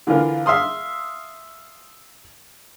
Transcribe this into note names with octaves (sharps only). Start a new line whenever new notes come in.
D3 E3 F4 A#4
E5 F5 C6 D#6